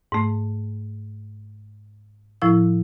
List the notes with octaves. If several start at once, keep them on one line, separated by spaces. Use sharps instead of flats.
G#2 A3
A2 F3 E4 E6